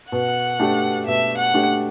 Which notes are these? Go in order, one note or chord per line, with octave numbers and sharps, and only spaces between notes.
B2 F#5
A3 D4 G4
B2 E5
F#5
A3 D4 G4